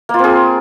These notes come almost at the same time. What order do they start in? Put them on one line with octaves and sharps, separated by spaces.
A#3 F4 C4 G#4